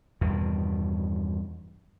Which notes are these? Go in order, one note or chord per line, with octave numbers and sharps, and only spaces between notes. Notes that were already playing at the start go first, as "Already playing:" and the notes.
E2 G2 B2 D#3